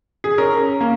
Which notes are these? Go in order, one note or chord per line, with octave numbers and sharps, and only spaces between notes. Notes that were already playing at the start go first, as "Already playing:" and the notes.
G#4
C#4 A#4
A#3